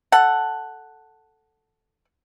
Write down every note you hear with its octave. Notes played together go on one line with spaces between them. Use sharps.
A4 F#5